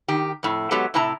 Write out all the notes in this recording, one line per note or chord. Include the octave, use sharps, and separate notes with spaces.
D#3 G4
F2 A2
F#3 G#3 B3 G4 A4
A2 C3 E4 A5 A#5